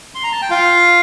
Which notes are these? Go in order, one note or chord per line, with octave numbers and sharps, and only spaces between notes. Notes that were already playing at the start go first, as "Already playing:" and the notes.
C6
A#5
A5
G5
F4 F5